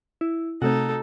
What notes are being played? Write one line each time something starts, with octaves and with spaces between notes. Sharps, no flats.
E4
C3 A3 C4 D#4 F#4 A4